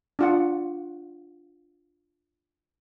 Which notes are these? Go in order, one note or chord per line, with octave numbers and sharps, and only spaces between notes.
D4 F4 F#5